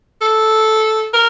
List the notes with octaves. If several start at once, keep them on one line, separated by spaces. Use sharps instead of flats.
A4
A#4